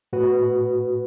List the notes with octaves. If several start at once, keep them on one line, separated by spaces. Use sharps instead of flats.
A2 F#4 B4